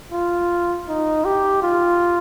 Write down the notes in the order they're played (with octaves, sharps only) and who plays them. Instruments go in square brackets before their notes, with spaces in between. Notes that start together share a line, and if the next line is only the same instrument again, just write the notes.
[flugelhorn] F4
D#4
G4
F4